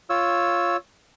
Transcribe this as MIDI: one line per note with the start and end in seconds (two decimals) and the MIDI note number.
0.10 0.77 65
0.10 0.77 73
0.10 0.77 88